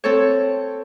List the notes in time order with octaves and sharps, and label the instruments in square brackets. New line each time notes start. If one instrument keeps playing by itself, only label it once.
[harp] C4 A4 C#5